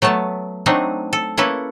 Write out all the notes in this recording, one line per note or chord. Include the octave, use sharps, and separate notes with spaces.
F#3 A3 B3 A5
F#3 A3 C4 D4 D#4
A4
A#3 C#4 E4 A4 B4